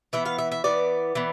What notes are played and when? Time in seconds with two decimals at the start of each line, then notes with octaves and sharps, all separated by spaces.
0.13 E3 B3 E5
0.25 F5
0.38 E5
0.52 E5
0.64 E3 B3 D5
1.15 E3 B3